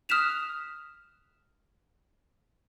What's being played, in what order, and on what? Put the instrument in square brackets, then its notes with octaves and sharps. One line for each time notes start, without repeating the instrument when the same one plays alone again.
[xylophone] D#6 F6 F#6 B6 E7 F7